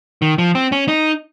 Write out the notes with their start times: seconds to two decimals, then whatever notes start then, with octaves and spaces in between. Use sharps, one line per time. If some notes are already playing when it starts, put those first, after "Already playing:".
0.22 D#3
0.38 F3
0.55 C4
0.72 C#4
0.88 D#4